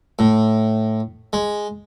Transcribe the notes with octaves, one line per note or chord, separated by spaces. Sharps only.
A2
G#3